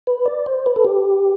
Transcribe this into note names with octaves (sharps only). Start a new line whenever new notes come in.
B4
D5
C5
B4
A4
G4